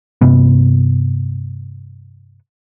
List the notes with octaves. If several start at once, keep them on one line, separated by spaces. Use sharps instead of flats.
G2 C3 B3